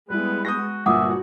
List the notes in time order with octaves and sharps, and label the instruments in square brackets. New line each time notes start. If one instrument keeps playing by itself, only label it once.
[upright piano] G3 E4 [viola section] G#3 B3 [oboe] B4
[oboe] F#4 [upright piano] D#6 G6 A#6
[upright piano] G1 A#2 G#5 [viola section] F#4 [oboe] E5 [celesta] F#5 D6 D#6